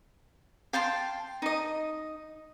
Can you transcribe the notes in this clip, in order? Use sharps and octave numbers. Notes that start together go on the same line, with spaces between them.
F5 G5 A5 C6
D#4 D#5